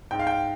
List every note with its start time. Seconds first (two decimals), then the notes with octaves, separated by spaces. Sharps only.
0.11 G#2 G5
0.19 F5
0.27 G5